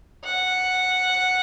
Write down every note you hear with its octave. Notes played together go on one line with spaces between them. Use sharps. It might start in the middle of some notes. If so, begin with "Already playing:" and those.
F#5